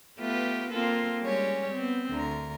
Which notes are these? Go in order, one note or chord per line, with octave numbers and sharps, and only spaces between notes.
A3 B3 F4 G4 B4
A#3 C4 F4 A4
G3 G#3 C#4 G4 C#5
B3 C4
D2 D3 A#4